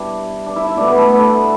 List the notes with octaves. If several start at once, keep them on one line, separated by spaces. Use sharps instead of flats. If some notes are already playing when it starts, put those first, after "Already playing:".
Already playing: B2 G3 D4 E4
D4
E4 E5
E4 E5
B2 A3 D4 D5
B3 B4
A3 A4
B3 B4
A3 A4